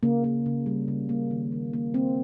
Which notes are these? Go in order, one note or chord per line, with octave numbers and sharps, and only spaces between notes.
C#3 A#3
A#3
C#3
G3
C#3
A#3
D#3
D#3
A#3
A#3 C4